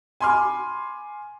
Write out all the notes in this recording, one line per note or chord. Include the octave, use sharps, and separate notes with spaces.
G#5 B5 C6 D6 F6